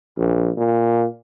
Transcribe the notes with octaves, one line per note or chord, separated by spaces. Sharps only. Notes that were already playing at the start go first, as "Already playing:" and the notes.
A#1
A#2